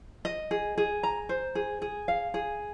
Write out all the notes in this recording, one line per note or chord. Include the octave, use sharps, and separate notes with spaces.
D#5
G#4
G#4
A#5
C5
G#4
G#4
F5
G#4